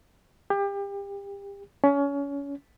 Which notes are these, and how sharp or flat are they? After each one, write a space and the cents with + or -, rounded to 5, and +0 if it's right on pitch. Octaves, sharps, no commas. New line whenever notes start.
G4 +30
C#4 +25